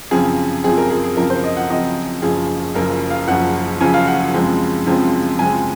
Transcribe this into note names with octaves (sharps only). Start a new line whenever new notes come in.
F#2 C#3 F3 C4 G#4
F#2 C#3 F3 C4 G#4
A#4
G#4
G#4
F#2 C#3 F3 C4 A#4
C5
D#5
F#5
F#2 C#3 F3 C4 D#5
F#1 F#2 C#3 F3 G#4
F#1 F#2 C#3 F3 A#4
F5
F#1 F#2 C#3 F3 F#5
F#1 F#2 C#3 F3 G#5
F5
F#5
F#2 C#3 F3 G#3 C4
F#2 C#3 F3 G#3 C4
F#2 C#3 F3 G#3 C4 G#5